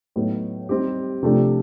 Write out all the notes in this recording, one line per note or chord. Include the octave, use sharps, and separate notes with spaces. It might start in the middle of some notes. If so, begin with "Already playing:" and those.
A2 F#3 B3 D#4
G3 C4 D#4 G4
C3 F3 A3 D4 G4